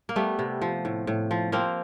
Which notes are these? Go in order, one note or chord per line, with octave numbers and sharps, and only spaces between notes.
A#3
G3 A3 B3
C3
F3
A2
A2
F3
F3 A#3 C4